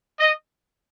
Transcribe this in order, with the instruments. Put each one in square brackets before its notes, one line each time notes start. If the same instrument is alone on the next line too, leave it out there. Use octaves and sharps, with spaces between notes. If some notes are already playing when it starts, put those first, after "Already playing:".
[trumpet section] D#5